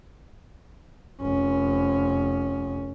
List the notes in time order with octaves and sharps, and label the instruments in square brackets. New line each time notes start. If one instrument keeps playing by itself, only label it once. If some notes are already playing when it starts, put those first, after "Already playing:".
[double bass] F1 C#4